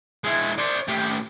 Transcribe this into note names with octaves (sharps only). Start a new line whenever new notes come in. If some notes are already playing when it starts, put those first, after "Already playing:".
G#3 E4
C5 D5
A2 G4